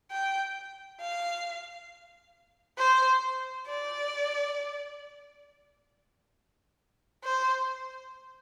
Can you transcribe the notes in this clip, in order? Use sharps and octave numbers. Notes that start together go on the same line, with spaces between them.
G5
F5
C5
D5
C5